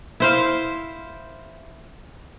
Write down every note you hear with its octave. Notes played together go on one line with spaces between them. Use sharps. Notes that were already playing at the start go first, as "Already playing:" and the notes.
E4 C5 F5